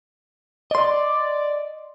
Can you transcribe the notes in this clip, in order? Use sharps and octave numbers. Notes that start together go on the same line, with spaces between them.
D5 D#5 C6